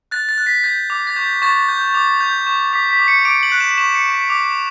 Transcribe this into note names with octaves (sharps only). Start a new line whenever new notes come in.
F#6 A6
A6
F#6
B6
G6 A6
D6
A6
C#6 G6
C#6 A6
G6
D6
G6
C#6
D6 B6
B6
D6
C#7
D6 D7
F#7
F#6
E7
F#7
C#6 E7
C#7
C#6
B6
D6